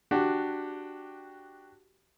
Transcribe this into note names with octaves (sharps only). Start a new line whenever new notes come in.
D4 F#4 G4